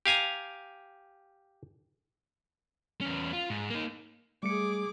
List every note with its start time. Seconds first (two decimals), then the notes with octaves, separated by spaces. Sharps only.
0.06 G4 F5 G#5 A#5
3.01 E2 C#4
3.33 F4
3.50 G#2
3.70 A#3 D#4
4.43 G3 A3 G#4 D6 C#7